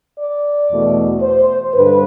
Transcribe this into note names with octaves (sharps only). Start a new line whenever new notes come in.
D5
E2 B2 A3
C5
G2 D3 B4